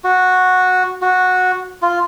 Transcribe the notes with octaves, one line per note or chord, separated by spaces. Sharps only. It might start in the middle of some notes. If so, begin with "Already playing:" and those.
F#4
F#4
F4